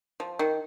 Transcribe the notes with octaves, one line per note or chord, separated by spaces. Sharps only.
F3
D#3